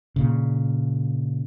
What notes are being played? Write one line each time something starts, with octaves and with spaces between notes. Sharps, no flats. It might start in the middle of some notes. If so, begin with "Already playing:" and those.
A#2 C#3